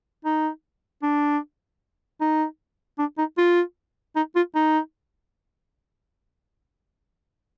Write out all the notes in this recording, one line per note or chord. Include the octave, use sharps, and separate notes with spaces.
D#4
D4
D#4
D4
D#4
F4
D#4
F4
D#4